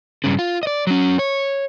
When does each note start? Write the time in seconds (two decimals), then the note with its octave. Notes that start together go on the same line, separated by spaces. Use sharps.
0.24 G2 C#3
0.39 F4
0.63 D5 D#5
0.87 F#3 C#4
1.19 C#5